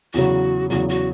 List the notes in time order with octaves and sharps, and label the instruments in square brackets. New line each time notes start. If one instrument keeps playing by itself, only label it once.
[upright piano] E2 C#3 F#3 [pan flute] F#4
[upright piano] E2 C#3 F#3 [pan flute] F#4
[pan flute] F#4